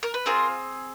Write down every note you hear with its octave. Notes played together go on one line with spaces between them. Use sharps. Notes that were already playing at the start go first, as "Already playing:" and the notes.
A#4
B4
C4 F4 G#4 A#4 C5